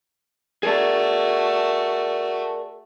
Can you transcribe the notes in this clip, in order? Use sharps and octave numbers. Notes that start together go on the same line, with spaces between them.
A3 F#4 G#4 A#4 D5